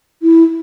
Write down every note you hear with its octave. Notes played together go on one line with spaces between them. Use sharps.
E4